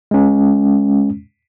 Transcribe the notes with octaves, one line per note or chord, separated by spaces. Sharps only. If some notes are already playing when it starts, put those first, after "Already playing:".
G#3 C#4